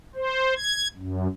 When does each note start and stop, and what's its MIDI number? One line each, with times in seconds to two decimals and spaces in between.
0.15 0.54 72
0.56 0.88 92
0.97 1.28 42